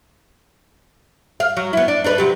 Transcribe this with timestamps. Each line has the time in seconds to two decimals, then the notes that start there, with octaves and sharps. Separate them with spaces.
1.40 F5
1.57 F#3
1.73 B3 E4
1.88 D4
2.04 D4 D#4 B4
2.18 C3 F#3 G4